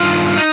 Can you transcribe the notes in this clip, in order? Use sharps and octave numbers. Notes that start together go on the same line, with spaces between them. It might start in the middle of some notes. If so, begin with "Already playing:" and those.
Already playing: G2 D#3 F4
D#4